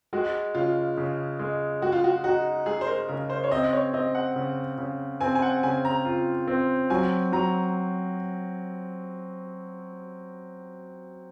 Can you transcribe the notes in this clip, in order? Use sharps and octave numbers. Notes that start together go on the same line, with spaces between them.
G#3 F#4
C#3 F4
C#3
G#3
G#3 F#4
F4
F#4
D#4 F#4
G#3 G#4
C5
A#4
C#3 A#4
C5
C#5
C4 D#5
C#5
C4 D#5
F#5
C#3
C#3
C4 G#5
G#5
F#5
C#3 G#5
A#5
F4
C4
F#3 G#5
F#3 A#5